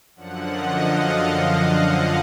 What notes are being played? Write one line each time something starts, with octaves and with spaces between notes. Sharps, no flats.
F#2 D3 F3 F#5
D#5
F5
F5
F#5